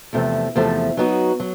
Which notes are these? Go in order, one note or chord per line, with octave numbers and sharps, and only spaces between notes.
E2 C3 F3 A3
E2 C3 F3 A3
F#3 B3 D#4 F#4
F#3